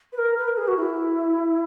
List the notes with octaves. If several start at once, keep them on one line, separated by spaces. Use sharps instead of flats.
B4
A#4
B4
A#4
G#4
F#4
E4